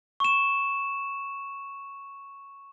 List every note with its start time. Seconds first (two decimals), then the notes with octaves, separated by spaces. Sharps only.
0.20 C#6 E7